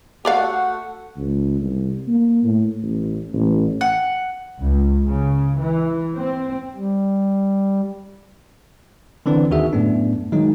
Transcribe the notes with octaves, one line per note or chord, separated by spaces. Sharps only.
A3 F#4 G4 D5 F5 F#5
C#2
C2
A#3
A2
A1
A1
F#5
C#2
C#3
E3
C4
G3
D3 E3 C4 D4 B4
D#2 D#3 F#4 G#4 E5
F#2 A2 A3 B3 D4
D#3 F#3 G#3 D#4